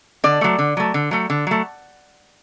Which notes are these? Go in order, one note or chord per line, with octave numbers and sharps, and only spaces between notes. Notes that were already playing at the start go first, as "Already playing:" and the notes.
D3 D5
F#3 A3
D3
F#3 A3
D3
F#3 A3
D3
F#3 A3